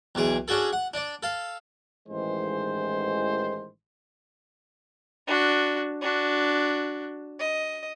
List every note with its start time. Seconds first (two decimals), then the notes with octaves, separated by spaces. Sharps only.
0.15 B1 E2 G#4 D6
0.48 C#4 D4 F#4 G#4 A4
0.73 F#5
0.94 D4 D5
1.23 A4 F5
2.08 A1 G#2 D#3 E3 G#3 C5
5.27 D4 F#4
6.01 D4 F#4
7.39 D#5